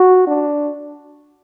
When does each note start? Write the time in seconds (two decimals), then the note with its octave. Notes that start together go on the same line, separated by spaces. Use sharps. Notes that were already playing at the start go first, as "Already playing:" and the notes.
Already playing: F#4
0.27 D4